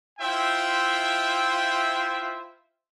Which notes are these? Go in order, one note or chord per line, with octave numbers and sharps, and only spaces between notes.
E4 F4 C5 E5 G5